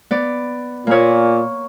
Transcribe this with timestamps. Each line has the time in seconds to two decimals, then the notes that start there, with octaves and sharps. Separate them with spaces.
0.11 B3 D5
0.87 A#2 A#3 C#5